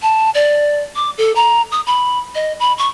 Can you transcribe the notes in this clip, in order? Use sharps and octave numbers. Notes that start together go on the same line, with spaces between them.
A5
D5
D6
A4
A#5
D#6
B5
D#5
B5
C#6